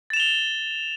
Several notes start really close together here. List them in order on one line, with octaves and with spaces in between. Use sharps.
A6 E7 F7 G7